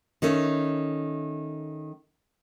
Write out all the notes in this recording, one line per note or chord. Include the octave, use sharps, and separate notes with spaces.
D#3 A3 C#4